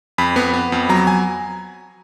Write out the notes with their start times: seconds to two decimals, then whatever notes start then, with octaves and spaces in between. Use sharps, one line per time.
0.18 F2 B5
0.36 B3
0.54 B3
0.72 F2
0.89 F#3 A#5
1.07 G#5